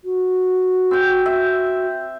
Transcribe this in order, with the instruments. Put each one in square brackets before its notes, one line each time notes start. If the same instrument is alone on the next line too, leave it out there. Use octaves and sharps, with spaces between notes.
[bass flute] F#4
[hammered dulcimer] C4 G5
E5